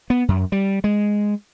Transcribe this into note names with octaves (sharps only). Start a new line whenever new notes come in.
B3
F#2
G3
G#3